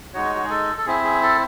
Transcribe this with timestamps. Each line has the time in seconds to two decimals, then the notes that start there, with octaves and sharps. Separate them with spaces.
0.14 G#3 D#4 F#4 C#5
0.35 F#4
0.43 G#4
0.50 A4
0.78 A4
0.86 C4 E4 G#4
1.04 G#4
1.22 A4